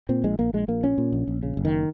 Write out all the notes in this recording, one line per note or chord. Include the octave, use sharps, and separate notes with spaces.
A#2 C4
A#1 G#3
A#1 A#3
A#1 G#3
A#1 A#3
A#2 C#4
A#2
A#1
A#1
C#3
F#1
D#3